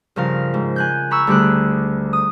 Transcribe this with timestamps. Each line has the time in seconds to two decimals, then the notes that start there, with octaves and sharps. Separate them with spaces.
0.16 G2 C#3 F3 A#4 F5
0.54 G#2
0.76 G#5 F#6 G6
1.11 A#5 B5 C#6 E6
1.27 D2 D3 G3 G4 G#4 F#6
2.13 D#6